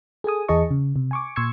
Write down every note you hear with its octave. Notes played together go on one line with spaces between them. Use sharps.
G#4 A4 G#5 D#6
E2 E3 G#4 D#5 A5 C#6
C#3
C3
G#5 C#6 D6
A#2 C6 C#6 E6 G#6 C#7